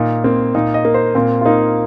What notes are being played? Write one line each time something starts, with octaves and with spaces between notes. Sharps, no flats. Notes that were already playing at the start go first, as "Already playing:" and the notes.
Already playing: A#2 D#3 A#3 D#4
A#3 C4
A#2 D#4
D#5
A#3
C5
A#2 C4
F4
A#3 D#4